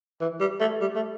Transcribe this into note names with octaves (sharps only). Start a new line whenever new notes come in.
E3
G3
A3
G3
A3